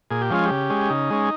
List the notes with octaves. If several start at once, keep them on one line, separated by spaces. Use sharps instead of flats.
A#2 G#4
G4
F3 G#3 C#4 F4
G4
C#3
G#3 C#4
C#3 D#4
G#3 C#4